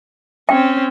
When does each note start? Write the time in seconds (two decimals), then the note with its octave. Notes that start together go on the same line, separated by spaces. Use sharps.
0.49 C4 C#4 G5